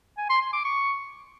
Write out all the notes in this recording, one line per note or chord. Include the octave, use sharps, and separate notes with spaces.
G#5
C6
C6
D6
C#6